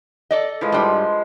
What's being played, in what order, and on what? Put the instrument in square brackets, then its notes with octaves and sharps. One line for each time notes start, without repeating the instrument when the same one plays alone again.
[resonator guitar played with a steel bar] A4 D5 D#5
[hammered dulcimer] E3 F3 G#3
[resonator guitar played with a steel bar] G2 G3 [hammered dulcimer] F3